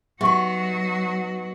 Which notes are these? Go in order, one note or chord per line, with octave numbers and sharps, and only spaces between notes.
F#3 B3 D#4 F#4 G4 E5 C#6